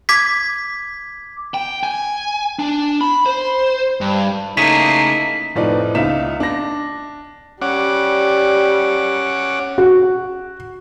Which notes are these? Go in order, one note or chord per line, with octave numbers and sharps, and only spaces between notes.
D6 G#6 B6
G5
G#5
D4
B5
C5
G2
C#3 A3 A#3 D#4 E4 G#4 B6
F1 A2 F3 D#4 B4 D5
C#2 D#4 E5 F5 B6 E7
D4 A#6
G3 C#4 F#5 D6
F#4